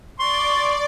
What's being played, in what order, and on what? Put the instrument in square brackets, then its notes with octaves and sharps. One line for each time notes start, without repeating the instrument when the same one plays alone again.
[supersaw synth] D5 [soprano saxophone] C6 [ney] C#6